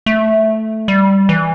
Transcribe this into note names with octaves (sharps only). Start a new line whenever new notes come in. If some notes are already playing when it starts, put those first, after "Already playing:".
A3
G3
E3